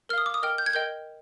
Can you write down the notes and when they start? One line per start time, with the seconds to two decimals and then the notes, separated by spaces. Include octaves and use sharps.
0.09 A#4 F6
0.13 F5 D#6
0.26 D6
0.34 D#6
0.42 A#4 D#5 G5 F6
0.58 G6
0.66 G#6
0.73 A#4 D#5 G5 G6